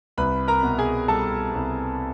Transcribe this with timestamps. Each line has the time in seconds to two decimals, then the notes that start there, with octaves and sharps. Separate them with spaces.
0.18 C2 B4 B5
0.48 A#4 A#5
0.63 B2
0.78 G#4 G#5
1.08 G3 A4 A5
1.54 C2